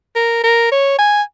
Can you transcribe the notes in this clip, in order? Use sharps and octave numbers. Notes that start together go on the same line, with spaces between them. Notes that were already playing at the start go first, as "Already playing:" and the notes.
A#4
A#4
C#5
G#5